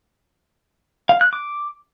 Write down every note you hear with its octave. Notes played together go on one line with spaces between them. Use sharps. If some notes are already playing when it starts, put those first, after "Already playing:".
F5
F#6
D6